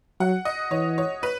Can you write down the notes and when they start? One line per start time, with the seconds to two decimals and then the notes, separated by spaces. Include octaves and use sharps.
0.20 F#3 F#5
0.45 D#5
0.71 E3 C#5
0.98 C#5
1.23 B4